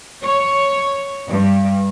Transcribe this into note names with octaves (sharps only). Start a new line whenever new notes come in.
C#5
G2